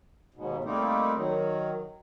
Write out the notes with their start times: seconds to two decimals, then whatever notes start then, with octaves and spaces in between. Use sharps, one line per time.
0.34 D#2 G#2 B2
0.64 G3 A3 A#3 C4 D#4
1.15 D#3 F#3